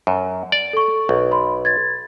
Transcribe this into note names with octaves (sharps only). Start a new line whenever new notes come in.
F#2
D5
A4 C#6
B1
B4 B5 C6
G#6 A6